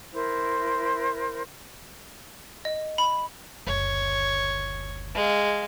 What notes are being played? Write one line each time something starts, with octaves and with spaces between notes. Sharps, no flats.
E4 A#4 C5
D#5
B5
F#1 D2 C#5
G#3 F5